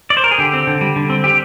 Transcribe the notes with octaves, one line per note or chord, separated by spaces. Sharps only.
D5
C5
A#4
G#4
D3 G4
C4
D3
G3
D3
C4
G3 G4